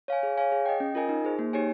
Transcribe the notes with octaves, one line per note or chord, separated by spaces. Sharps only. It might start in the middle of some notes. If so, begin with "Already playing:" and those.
C#5 F5 G#5
G#4
C#5 F5 G#5
G#4
D#5 G5
C#4
F4 A#4 D#5 G#5
D#4
G#4 C5
A#3
D#4 G4 C#5 G#5